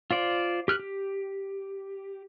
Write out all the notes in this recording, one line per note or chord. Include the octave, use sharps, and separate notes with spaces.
F4 C5 D5
G4 F6 F#6
G4